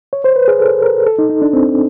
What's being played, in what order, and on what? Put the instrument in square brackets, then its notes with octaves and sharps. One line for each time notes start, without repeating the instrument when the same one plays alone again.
[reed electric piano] C#5
C5
B4
G#4
A4
A#4
A4
D#4
D#4
D4
C4